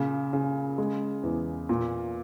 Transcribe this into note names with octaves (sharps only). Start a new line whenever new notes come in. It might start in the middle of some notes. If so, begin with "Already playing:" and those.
Already playing: A#2 C#3
C#3
G#3
E2
A#2